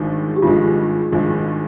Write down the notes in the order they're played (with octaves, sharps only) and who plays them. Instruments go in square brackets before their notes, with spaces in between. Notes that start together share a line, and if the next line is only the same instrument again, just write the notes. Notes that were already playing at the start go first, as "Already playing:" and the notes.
Already playing: [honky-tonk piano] G#1 G2 F3 G#3 [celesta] D#4
[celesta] G4
[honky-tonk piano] G#1 G2 F3 G#3 [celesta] F4
[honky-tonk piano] G#1 G2 F3 G#3